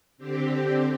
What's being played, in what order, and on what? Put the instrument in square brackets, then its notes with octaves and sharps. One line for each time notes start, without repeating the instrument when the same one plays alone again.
[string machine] D3 C4 G4